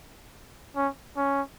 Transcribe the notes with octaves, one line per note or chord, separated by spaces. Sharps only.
C#4
C#4